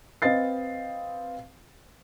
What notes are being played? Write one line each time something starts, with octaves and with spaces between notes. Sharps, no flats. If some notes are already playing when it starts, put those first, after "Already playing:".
C4 B4 D#5 F5 A6 C7